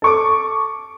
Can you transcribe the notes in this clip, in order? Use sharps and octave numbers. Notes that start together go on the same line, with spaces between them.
A4 C#6 D6